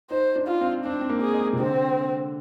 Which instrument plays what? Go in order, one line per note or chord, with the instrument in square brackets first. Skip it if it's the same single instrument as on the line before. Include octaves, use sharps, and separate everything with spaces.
[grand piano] D#4 [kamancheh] C5
[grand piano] D4
[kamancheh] F4
[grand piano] C4
[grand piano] C4 [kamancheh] D4
[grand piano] C4
A#3
[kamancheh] G#4
[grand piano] G#3
C3
[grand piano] D3 [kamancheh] C4